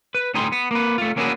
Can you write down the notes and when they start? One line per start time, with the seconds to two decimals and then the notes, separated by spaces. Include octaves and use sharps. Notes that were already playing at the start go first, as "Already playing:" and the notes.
0.15 B4
0.34 D2 A2 D#4 G#4 G5 C6
0.52 B3
0.71 A#3 B4
0.98 A3 F4
1.17 A#3 C#4 D4 E4 F#4 G#4